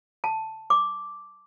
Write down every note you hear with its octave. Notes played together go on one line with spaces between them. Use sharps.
A5
D6